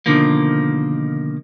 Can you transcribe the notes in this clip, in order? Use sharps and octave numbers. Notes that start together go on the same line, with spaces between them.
B2 D3 D#3 F3 A#3